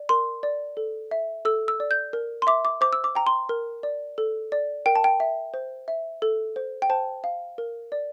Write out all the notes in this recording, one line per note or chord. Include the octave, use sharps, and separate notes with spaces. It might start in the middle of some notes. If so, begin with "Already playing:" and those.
Already playing: D5
A#4 C6
D5
A4
E5
A4 E6
E6
D5
G6
A#4
C6
E5 D6
D6
C5 D6
E6
D6
G5 A#5
C6
A#4
D5
A4
D5
A#4 G5
A5
G5
E5
C5
E5
A4
C5
G5
C5 A5
F5
A#4
D5